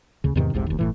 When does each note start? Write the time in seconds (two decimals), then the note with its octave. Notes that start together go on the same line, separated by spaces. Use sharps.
0.24 D2 C#3
0.36 E2 G#2 C3 D#3
0.54 F1 C2 G#2 C3
0.66 F1 D#2
0.79 G1 A2 E3